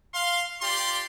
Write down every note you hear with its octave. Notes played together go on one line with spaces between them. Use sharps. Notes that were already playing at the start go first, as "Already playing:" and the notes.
F5 C6
F4 G4 D5 C6